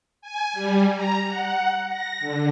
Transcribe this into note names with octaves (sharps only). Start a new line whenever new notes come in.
G#5
G3
A#5
F#5
A#6
D3